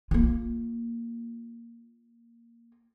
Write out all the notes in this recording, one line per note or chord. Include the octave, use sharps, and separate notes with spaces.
A#3 F4